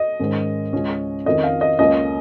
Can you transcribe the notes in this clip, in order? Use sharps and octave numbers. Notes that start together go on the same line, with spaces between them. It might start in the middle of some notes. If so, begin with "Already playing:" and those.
Already playing: D#5
G#2 D#3 G#3 C#4
C#2 C#3 G#3 C#4
F2 D#3 C#4 D#5
F5
D#5
C#2 C#3 A#3 C#4 D#5